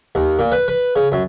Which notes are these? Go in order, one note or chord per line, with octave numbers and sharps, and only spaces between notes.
D#2
A#2
B4
B4
C#3
F#2